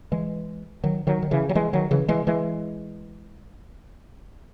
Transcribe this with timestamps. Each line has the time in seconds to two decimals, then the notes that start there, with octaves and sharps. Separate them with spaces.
0.12 E3 G#3
0.84 D#3 F#3
1.07 D#3 F#3
1.22 D#3
1.31 C#3 E3
1.49 F#3
1.55 E3 G#3
1.73 D#3 F#3
1.91 C#3 E3
2.08 E3 G#3
2.27 E3 G#3